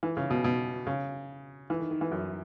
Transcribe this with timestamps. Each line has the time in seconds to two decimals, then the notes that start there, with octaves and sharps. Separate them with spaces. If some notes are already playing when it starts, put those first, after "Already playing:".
0.03 E3
0.17 C#3
0.30 B2
0.44 B2
0.87 C#3
1.70 E3
1.80 D#3
1.91 D#3
2.01 E3
2.11 F#2